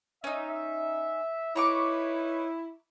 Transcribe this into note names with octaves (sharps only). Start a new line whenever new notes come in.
C#4 D#4 E5
D#4 E4 B4 C#5 A#5 C#6 D6